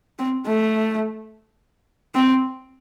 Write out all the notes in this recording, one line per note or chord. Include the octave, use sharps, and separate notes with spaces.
C4
A3
C4